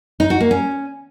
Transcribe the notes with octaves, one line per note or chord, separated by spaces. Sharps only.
D#4
F#4
A#3
C#4